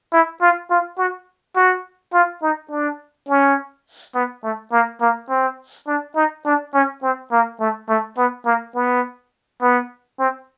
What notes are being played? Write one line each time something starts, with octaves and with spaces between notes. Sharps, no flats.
E4
F4
F4
F#4
F#4
F4
D#4
D4
C#4
B3
A3
A#3
A#3
C4
D4
D#4
D4
C#4
C4
A#3
A3
A3
B3
A#3
B3
B3
C4